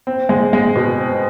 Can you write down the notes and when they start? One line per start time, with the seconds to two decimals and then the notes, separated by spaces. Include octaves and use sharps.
0.07 C4
0.29 G#3
0.53 G#3
0.76 B2
0.98 C4